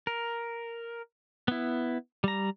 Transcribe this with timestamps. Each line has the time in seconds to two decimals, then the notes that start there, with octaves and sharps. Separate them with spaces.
0.07 A#4
1.48 B3 E4
2.24 G3 A#5